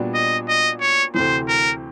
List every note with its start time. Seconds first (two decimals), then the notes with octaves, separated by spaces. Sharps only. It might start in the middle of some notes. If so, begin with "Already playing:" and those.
Already playing: A#2 G3 B3 D4 F#4
0.14 D#5
0.48 D#5
0.80 C#5
1.14 D2 C3 E3 C5
1.48 A#4